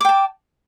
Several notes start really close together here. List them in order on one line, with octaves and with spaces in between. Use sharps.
D6 G5 A5